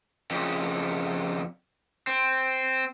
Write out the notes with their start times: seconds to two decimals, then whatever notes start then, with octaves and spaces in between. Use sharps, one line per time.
0.31 F2 C#3
2.07 C4